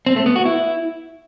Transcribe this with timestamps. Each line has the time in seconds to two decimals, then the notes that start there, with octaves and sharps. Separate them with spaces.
0.06 C4
0.16 A3
0.26 B3
0.36 F#4
0.45 E4